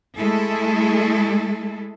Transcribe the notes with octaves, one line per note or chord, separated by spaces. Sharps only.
G#3 A3 E4 G#4 A4